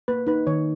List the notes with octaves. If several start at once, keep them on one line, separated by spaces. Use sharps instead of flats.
A#3 B4
D#4 B4
D#3 C#5